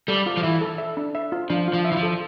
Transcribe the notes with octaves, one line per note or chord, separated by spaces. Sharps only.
G3 A4
F4
F3
E3 E5
A4
E5
D4
E5
F4
F3 D4
F4
F3
E5
E3
F3
A4